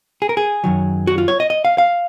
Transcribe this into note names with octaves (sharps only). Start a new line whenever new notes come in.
G#4
A#4
G#4
F#2 D#3 F#3
F#4
F4
C#5
D#5
D#5
F5
F5